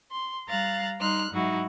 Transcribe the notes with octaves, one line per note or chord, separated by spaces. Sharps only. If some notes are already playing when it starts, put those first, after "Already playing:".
C6
G3 F5 A#5 F#6 A6
G3 D#4 C6 F6 F#6
G#2 F#3 D#4 E4 F#4